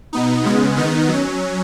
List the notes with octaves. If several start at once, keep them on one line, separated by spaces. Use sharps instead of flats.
B2 B3 D#4
C#3 G#3 B3
D#3 B3 D#4
F#3 C#4